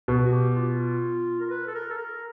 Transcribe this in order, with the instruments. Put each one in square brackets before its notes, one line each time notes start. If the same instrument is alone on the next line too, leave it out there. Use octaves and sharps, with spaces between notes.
[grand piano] B2
[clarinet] F#4
G4
F4
A#4
B4
A4
A#4
A4
A#4